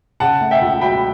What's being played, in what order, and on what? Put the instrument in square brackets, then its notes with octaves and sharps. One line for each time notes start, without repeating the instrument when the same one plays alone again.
[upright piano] C#3 F#5 A5
A3
E5 G5
C#2
F#3 G5 B5